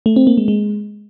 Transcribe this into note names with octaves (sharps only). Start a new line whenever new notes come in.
A3
C4
A#3
G#3
G#3